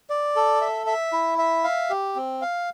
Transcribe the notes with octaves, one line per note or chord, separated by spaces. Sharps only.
D5
A4
E5
E5
E4
E5
F5
G4
C4
F5